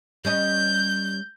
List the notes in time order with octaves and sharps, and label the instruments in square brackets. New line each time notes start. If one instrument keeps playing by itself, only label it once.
[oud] G3 C#4 D#5 [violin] G6